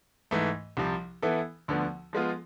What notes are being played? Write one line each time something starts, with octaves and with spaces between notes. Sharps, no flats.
G#2 E3 A3
C2 C3 F3
E3 B3 E4 A4
D2 D3 F3 B3
F3 G#3 B3 F4